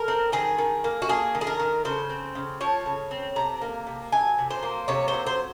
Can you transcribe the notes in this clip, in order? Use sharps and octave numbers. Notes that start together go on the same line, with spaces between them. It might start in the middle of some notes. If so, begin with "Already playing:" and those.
Already playing: A#4
C4
D#3 G#4
D#3
A#3
F#4
A#3 G#4
D#3
G#4
A#4
D#3
C#3 C5
C4
C#3
F3 C#5
C#3
C4
C3 A#5
A#3
C3
F#3 G#5
C3
C5
A#3
C3 C#5
C5
F#3
C5